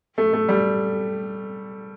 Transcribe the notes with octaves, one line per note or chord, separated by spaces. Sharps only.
A3
A3
G3